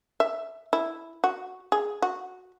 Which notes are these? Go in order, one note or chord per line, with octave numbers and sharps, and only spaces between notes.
E5
E4
F#4
G#4
F#4